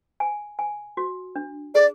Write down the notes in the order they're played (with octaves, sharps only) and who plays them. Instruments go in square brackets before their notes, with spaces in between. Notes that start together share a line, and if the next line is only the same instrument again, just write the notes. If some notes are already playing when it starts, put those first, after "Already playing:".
[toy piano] G#5
G#5
F#4
D4
[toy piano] G#4 [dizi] D5